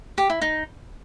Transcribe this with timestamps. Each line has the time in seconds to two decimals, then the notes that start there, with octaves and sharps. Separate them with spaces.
0.18 G4
0.30 E4
0.42 D#4